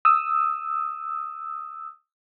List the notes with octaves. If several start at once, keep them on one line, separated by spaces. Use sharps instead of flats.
D#6 E6